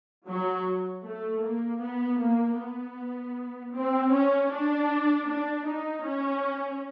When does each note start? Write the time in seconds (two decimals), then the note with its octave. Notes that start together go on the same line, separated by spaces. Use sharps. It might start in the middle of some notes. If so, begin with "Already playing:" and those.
0.27 F#3
1.04 A3
1.43 A#3
1.81 B3
2.20 A#3
2.58 B3
3.74 C4
4.12 C#4
4.52 D4
5.29 D4
5.67 D#4
6.05 C#4